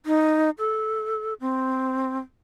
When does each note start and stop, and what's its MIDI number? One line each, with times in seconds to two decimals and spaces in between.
0.06 0.50 63
0.59 1.34 69
1.40 2.18 60